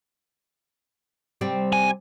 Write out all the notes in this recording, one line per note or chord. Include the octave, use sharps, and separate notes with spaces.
C3 G3 C4
G#5